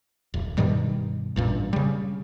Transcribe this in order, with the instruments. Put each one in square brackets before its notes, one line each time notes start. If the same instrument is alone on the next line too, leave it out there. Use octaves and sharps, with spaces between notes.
[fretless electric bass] D1
G2 B2 D#3 G3
A1 G2 A#2
C#3 G3